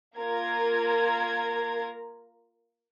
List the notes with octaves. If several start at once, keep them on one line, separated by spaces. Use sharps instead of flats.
A#3 F4 A#4 A#5 G#6